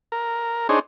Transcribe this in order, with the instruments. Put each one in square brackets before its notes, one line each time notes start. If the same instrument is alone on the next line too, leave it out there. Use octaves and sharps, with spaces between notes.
[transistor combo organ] A#4
D4 D#4 G#4 C5 C#5